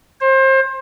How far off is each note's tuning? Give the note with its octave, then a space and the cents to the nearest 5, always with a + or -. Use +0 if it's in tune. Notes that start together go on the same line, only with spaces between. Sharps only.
C5 +30